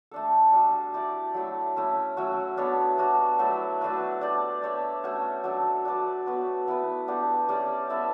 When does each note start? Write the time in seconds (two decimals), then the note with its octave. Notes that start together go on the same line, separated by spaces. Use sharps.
0.11 A3 D4 A4
0.53 G3 D4 F#4
0.94 E4 G4 D5
1.34 F#3 A3 E4
1.76 A3 C#4 E4
2.17 F#3 A3 C#4 F#4
2.57 B3 D4 A4 C#5
2.98 G3 D4 F#4
3.39 F#3 A3 E4
3.81 A3 D4 F#4 B4
4.21 D4 G4 D5
4.62 D4 G4 C#5 E5
5.03 A3 C#4 F#4 C#5
5.44 F#3 A3 D4
5.85 D4 F#4 B4 D5
6.26 B3 F#4 B4
6.67 B3 E4 B4
7.08 G3 B3 D4 G4
7.49 G3 C#4 G4 D5
7.90 B3 E4 A4 E5